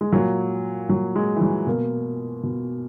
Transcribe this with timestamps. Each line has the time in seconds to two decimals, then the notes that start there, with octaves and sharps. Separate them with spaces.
0.01 G#3
0.12 A#2 F#3
0.89 A#2 F#3
1.16 G#3
1.36 E3
1.41 F#3
1.67 B2 A#3
2.43 B2